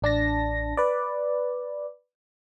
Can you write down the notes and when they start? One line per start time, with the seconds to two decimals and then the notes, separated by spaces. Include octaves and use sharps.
0.02 A1 D4 A5 A#6
0.77 B4 D5